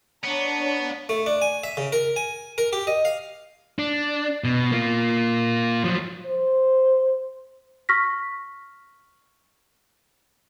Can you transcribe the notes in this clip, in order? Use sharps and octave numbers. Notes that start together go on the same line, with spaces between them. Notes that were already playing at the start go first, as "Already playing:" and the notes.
B3 D4 C#5 A#5
A3
D4
G#5
E5
C#3
A#4
G#5
A#4
G4
D#5
F5
D4
B2
A#3 F4
F3 F#3
C5
C#6 F6 A#6 B6